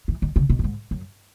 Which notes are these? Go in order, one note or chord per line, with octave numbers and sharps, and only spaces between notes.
E3
D#3
C#3
B2
F#2
G#2
F#2